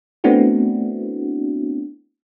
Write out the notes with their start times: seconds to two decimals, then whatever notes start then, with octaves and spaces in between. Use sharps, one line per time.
0.24 A3 B3 C4 D4 E4 F#4